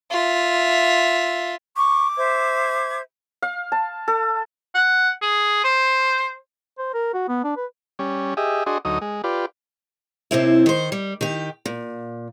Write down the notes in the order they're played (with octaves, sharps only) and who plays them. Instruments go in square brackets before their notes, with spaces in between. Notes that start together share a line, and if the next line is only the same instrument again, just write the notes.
[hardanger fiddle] F4 E5
[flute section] C#6 [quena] D6
[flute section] C5 E5 G#6
[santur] F5
A5
A4
[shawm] F#5
G#4
C5
[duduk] C5
A#4
F#4
B3
D4
B4
[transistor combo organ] G3 C#4
G4 G#4 D#5 E5
D4 F#4 G#4 D#5 C6
D2 F#3 D#4 D#6
G#3
F4 G4 B4 D5
[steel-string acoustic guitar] D#2 C3 C4 E4
D#3 C5
G3
D#3 G4
A#2